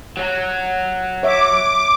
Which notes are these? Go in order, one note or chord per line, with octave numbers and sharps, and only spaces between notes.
F#3 F#4
C#5 E5 D6